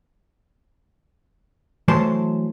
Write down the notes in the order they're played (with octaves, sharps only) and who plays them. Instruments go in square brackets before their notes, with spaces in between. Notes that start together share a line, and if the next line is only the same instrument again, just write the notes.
[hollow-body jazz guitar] E3 F#3 A3 C5 A5 C6